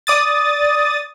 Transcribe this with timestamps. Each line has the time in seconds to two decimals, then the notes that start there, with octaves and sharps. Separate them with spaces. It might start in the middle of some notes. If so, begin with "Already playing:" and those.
0.07 D5 D#6 A6